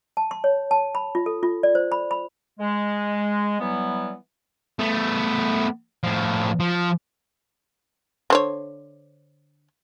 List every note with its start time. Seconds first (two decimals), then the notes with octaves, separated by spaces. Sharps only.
0.17 A5
0.31 C6
0.44 C#5
0.71 A5
0.95 B5
1.15 F4
1.26 A4
1.43 F4
1.63 D5
1.75 C5
1.92 B5
2.11 B5
2.60 G#3
3.60 E3 F#3 G3 B3
4.79 A3 B3
6.04 A2 F3
6.60 F3
8.30 D3 C5 C#5